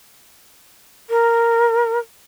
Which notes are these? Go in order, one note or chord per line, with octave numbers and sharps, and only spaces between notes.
A#4